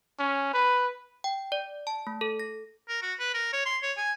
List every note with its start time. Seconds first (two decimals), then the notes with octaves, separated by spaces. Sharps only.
0.19 C#4
0.53 B4
1.24 G5
1.52 D5
1.87 A5
2.07 A3
2.21 A4
2.39 A#6
2.89 A#4
3.02 F#4
3.19 B4
3.34 A#4
3.53 C#5
3.66 C6
3.83 C#5
3.97 G#5